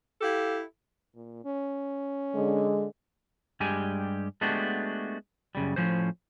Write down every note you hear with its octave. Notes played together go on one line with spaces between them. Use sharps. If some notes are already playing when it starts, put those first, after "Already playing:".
E4 G4 A4 F5
A#2
C#4
D3 G#3
G2 G3 G#3 G4 G#5
G#3 A3 B3 D4 F#4 G4
F#2 C#3 G3
A2 F3 C#4 C5